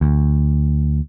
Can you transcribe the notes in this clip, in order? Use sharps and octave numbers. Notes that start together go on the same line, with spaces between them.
D2